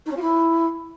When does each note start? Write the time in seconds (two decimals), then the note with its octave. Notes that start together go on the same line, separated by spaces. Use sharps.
0.06 D#4
0.11 C#4
0.16 F4
0.21 E4